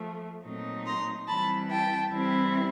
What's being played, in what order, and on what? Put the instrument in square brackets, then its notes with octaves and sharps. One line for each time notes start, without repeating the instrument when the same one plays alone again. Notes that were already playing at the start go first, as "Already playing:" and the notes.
Already playing: [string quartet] F3 A3
A#2 F#3 A3 C4 D#4
A#5 C6
E3 G3 C4 E4 A5 B5
G5 A5
E3 G3 C4 E4